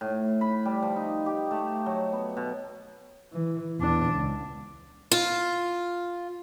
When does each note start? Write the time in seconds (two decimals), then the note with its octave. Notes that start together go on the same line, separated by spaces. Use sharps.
0.01 A2
0.41 B5
0.65 G3
0.82 F3
0.96 D#4
1.26 G4
1.51 A3
1.86 F#3
2.13 B3
2.37 B2
3.32 E3
3.79 E2 D4
4.13 C#2
5.11 F4